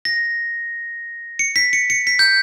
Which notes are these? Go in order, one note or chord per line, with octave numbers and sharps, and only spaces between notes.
A#6
C#7
B6
C#7
C#7
B6
G6